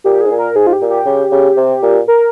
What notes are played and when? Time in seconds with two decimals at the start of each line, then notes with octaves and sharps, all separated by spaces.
0.04 A#2 G4
0.21 G#2 G#4
0.30 A#2
0.39 A#4
0.55 G#2 G#4
0.67 F4
0.73 G4
0.81 A#2
0.90 G4
1.06 C#3
1.31 C#3
1.57 C3
1.82 A#2
2.08 A#4